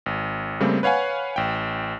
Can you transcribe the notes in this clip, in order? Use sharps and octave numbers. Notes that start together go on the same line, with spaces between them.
G#1
C#3 G3 A3 A#3 C4
B4 C#5 F5 F#5 G#5
A1 G5